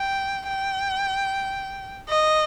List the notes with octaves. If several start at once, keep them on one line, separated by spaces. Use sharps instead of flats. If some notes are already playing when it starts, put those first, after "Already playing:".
Already playing: G5
G5
D#5